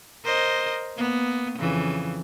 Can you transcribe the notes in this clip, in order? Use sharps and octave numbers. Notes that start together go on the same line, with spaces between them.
A#4 C5 D#5
A#3 B3
F2 C#3 E3